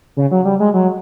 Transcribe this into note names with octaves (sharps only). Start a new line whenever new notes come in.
C#3
F#3
G3
G#3
F#3